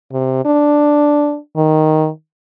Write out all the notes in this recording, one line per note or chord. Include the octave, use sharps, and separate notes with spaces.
C3
D4
D#3